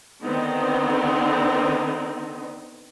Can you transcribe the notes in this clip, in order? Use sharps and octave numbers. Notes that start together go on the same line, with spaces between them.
D3 D#3 B3 C4 D#4